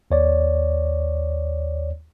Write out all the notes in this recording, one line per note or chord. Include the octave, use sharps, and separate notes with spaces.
D#2 C#5 D5